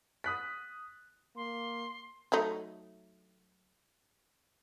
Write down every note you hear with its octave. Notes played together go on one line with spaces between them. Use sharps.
D#6 F#6 B6
A#3 C6
F#3 A3 D#4